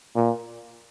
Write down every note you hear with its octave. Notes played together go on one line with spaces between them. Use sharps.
A#2